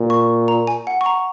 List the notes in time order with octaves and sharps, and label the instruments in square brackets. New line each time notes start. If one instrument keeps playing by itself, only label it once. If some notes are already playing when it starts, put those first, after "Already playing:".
Already playing: [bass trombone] A#2
[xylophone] C#6
A#5
G#5
F#5
C#6
A#5